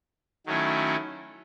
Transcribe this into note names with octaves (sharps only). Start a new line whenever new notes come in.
D#3 F#3 A3 C#4 E4